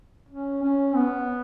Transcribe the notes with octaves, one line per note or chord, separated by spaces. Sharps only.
C#4
C#4
B3